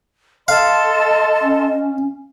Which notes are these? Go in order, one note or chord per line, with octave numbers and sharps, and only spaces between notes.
A4 D#5 F5 A5 C6
C#4